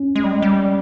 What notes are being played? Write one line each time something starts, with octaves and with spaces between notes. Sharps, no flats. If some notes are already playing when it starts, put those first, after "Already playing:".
Already playing: C#4
G#3
G3
G#3
G3